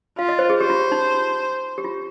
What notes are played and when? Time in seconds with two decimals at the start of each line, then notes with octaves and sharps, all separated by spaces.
0.18 F4 F5
0.29 D#5
0.39 C5
0.50 G#4
0.60 G4 C5
0.70 F4
0.81 F4
0.92 D#4
1.78 G4
1.84 F4